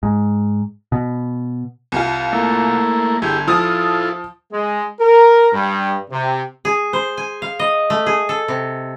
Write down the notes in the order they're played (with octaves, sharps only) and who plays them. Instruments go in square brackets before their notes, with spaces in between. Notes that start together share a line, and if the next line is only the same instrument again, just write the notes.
[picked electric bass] G#2
B2
[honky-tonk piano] C2 F4
[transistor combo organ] A3 A#3 E4
[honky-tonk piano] G1 [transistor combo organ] E4 G4 G#4
[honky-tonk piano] F3 D#6 [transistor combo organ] E4 F4 A4
[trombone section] G#3
A#4
G2
C3
[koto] G#4
C5
G#5
F5
D#5
A3
G#4
A4
C3